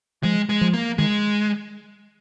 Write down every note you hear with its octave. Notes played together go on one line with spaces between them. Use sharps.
F3 G#3
G#3
F3
A#3
D#3 G#3